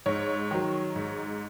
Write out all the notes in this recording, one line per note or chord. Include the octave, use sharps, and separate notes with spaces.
G#2 C#5
D#3 F#3
G#2